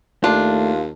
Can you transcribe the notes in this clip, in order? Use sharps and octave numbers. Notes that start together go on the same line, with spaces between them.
D#2 A3 D4 F4